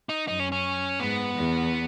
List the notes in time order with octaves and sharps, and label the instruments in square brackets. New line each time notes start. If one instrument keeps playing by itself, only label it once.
[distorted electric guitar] D#4
[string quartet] F#2 [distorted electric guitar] D#4
[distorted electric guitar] C#4
C#4
[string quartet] G#2 [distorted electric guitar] B3
[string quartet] E2